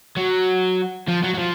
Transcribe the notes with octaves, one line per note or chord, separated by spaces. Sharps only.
F#3
F3
F#3
F#3
F3